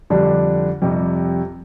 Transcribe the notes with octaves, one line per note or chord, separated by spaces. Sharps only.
F2 D3 G3 D4 G4
F2 C3 G3